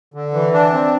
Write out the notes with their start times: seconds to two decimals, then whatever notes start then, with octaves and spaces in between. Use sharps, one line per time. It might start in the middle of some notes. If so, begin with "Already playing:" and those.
0.14 D3
0.33 E3
0.53 D4
0.73 C4